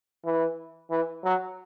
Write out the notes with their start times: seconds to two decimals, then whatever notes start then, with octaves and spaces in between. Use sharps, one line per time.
0.25 E3
0.90 E3
1.24 F#3